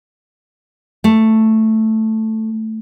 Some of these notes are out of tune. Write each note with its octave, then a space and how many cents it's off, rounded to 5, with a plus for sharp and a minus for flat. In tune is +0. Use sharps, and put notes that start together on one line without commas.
A3 +5